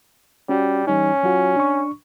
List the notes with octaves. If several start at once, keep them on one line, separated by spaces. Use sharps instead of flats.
G3 C#4 F#4
E3 G3 C#4 D#4
F#3 F4 F#4
D4 C#6